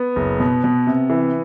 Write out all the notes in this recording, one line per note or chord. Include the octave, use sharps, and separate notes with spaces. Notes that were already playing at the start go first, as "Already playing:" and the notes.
Already playing: B3
F#1
B2
B2
C3
E3